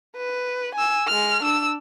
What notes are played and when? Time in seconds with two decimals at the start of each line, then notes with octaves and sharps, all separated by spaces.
0.17 B4
0.75 G#5 E6
1.07 G#3 F6
1.44 D4 E6